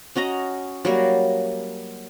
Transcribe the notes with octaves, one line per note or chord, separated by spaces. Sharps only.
C#4 F#4 D#5 A#5
F#3 G3 A#3